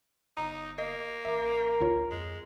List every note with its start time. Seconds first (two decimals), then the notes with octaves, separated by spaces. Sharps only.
0.37 G1 D#4 A#5
0.78 A#3 D#5
1.25 A1 A#4 E5 D6
1.81 D2 F4 C#5
2.11 F2 G#3